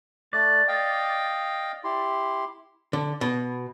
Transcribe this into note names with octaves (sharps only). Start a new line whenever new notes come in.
A3 D5 F#6
D#5 F5 G5
E4 G4 C6
D3
B2